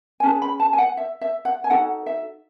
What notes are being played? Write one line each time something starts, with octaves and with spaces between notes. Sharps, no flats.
G#5
C#4 G#4 B4 A5
B5
A5
G#5
F#5
E5
E5
F#5
G#5
D#4 F#4 A4 F#5
E5